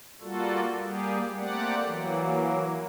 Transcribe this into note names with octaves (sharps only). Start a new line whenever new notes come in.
G3 A#3 F4 F#4 A4
G3 A#3 G4 G#4
A3 A#3 C4 G4 D5 F#5
E3 F#3 A#3